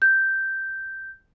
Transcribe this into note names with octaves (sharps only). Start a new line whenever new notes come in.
G6